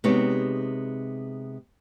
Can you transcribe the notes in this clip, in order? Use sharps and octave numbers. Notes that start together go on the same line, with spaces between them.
C3 G#3 B3 D#4 G4 C#5